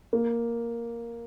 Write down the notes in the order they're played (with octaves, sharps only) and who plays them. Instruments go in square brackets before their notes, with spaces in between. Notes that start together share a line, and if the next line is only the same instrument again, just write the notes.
[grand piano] A#3